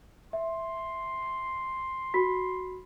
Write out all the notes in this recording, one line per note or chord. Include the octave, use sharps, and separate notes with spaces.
E5 C6
F#4 B5 B6